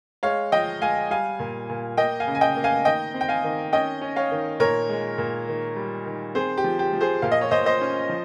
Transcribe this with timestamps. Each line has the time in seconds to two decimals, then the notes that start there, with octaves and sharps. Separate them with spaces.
0.23 G#3 C#5 F5
0.52 F3 D#5 G5
0.82 G#3 F5 G#5
1.10 G3 F5 G#5
1.39 A#2
1.70 A#2
1.97 A#3 D#5 G5
2.20 F5 G#5
2.27 C#3
2.35 G#5
2.41 D#5 G5
2.56 A#3
2.64 F5 G#5
2.85 D#3 D#5 G5
3.14 C4
3.21 G5
3.29 F5 G#5
3.44 D#3
3.73 C#4 D#5 G5
4.01 C#4
4.16 C#5 F5
4.31 D#3
4.60 A#2 A#4 C#5
4.89 G#3
5.18 A#2
5.48 D#3
5.76 G3
6.05 D#3
6.35 C4 G#4 C5
6.57 G4
6.64 F3
6.79 G4
6.93 F3
7.01 G#4 C5
7.22 A#2 F5
7.32 D#5
7.41 C#5
7.51 A#2 C5 D#5
7.66 C5 D#5
7.81 C#4
8.09 F3